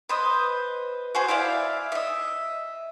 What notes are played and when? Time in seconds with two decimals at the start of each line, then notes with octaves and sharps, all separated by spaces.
0.09 B4 C5 D#5
1.15 F#4 G#4 C5
1.28 E4 D5 E5 F5
1.92 D#5 E5